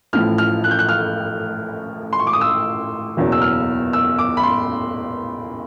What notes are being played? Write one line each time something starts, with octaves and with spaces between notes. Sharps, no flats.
A1 A2 F3 F6
F6
F#6
G6
F#6
F6
C6
C#6
D6
D#6
E6
F#1 E2 B2 F#3
E6
F6
E6
D6
B5
C6